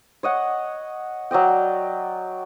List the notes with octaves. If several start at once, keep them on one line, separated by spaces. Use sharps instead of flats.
C#5 D#5 F#5
F#3 D5 D#5 G5